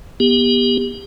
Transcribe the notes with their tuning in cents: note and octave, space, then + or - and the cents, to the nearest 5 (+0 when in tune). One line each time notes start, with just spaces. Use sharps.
B3 -30 G4 +25